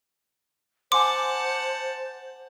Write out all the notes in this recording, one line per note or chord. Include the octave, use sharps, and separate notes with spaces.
C5 F#5 G#5 A5 C6 D6